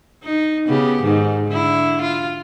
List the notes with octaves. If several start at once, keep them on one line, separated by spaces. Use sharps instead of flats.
D#4
C#3 B3 G4
G#2 D#3
D3 E4
F4